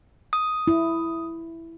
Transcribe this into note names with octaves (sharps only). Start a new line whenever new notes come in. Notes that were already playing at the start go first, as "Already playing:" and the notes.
D#6
E4